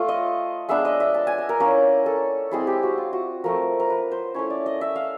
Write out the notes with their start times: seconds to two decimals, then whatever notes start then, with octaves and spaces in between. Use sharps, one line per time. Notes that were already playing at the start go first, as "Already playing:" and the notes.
Already playing: A3 F4
0.09 D#5
0.69 G#3 B3 D4 E5
0.85 D#5
1.00 E5
1.14 A5
1.27 G#5
1.38 D#5
1.49 A#4
1.60 A#3 C#4 E4 A#4
2.06 A4
2.51 G#3 C4 E4 G#4
2.67 G4
2.83 F#4
2.98 F4
3.13 F#4
3.44 F3 A3 C4 A#4
3.80 A#4
3.90 B4
4.11 C5
4.34 A3 C#4 E4 C#5
4.50 D5
4.66 D#5
4.81 E5
4.96 F5